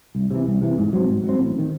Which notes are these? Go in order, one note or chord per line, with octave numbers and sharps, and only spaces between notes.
C2
C3 E3
C2
C3 E3
G#2
F#3 C4
G#2
F#3 C4
A1
D#3